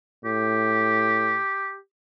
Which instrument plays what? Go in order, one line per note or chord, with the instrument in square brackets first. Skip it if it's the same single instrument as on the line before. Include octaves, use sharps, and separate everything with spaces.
[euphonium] A2 [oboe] G4